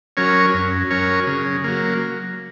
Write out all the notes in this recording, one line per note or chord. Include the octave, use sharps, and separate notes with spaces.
F#3 C#4 A#4 C#5
F#2
F#3 C#4 A#4 C#5
C#3
F#3 A#3